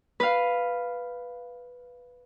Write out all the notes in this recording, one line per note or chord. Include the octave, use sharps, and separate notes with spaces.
B4 F5